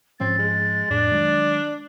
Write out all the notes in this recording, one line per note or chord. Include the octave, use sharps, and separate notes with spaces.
G#2 F3 C4 C#4 A6
G#3
F2 A2 D4
D#3 F#3 G#3